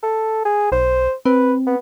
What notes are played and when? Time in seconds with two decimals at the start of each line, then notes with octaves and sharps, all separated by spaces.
0.03 A4
0.45 G#4
0.72 B1 C5
1.26 C4 B4
1.66 B3